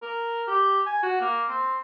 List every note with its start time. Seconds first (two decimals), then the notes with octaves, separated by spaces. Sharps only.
0.02 A#4
0.47 G4
0.86 G#5
1.03 F#4
1.21 A#3
1.48 C4